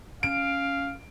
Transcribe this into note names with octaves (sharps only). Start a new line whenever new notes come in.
C#4 F5 D7